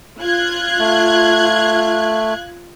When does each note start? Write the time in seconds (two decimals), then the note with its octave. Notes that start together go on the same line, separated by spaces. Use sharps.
0.21 F4 F#6 G#6
0.79 A3